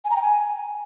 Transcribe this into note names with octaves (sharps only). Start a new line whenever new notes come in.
G#5
A#5
G5
G#5